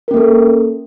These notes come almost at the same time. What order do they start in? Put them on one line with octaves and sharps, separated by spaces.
A#4 C#4 A#3 A4